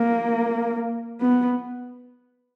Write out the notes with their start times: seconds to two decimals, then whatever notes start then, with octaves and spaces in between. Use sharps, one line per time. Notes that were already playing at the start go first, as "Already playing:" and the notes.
Already playing: A#3
1.21 B3